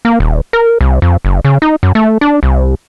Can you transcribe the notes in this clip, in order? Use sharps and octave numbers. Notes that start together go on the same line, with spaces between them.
A#3
D#1
A#4
C2
F2
F#1
C#3
D#4
F#2
A3
D4
C2